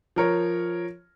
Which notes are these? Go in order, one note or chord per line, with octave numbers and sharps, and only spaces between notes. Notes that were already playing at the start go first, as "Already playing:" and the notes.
F3 A#4 C#5